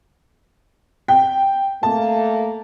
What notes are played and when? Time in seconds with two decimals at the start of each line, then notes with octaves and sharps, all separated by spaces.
1.08 G5
1.83 A3 A#3 A5